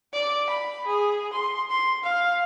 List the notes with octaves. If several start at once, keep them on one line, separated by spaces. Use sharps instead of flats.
D5
B5
G#4
C6
C6
F5